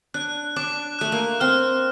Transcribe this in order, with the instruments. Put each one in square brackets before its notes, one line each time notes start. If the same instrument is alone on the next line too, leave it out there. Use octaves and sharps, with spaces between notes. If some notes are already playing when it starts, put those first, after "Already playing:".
[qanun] D4 [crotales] F#6
[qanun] D4 [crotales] D6
[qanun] A3 [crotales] F#6
[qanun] A#3
[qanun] C4 [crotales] F6